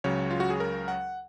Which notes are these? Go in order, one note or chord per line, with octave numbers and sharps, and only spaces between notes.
C#2 C#3 F#3 C#5
F4
F#4
G#4
A#4
F#5